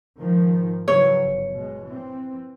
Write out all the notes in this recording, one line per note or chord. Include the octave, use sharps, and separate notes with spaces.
G#2 D#3 F3
C#3 E3 F#3 C#5
G1
B2 G#3
E3 C4